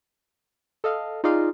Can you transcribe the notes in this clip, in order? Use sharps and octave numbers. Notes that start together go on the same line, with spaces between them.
A4 D#5 F5
D#4 F4 G#4 D5 D#5 F5